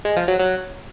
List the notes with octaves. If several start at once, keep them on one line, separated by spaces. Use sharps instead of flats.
G#3
F3
F#3
F#3